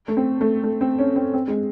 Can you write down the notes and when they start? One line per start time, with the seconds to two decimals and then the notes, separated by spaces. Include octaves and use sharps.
0.08 A3
0.17 C4
0.41 A3
0.64 A3
0.81 C4
0.99 C#4
1.16 C4
1.33 C4
1.48 G#3